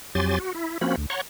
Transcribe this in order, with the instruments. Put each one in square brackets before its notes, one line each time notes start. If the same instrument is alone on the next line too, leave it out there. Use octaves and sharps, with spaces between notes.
[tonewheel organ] F2 F#3 G4 G#5 C6 A6
F#4
E4
F3 A#3 C4 C#4 F#4 B5
D2
C#5 F#5 A#5 C6 C#6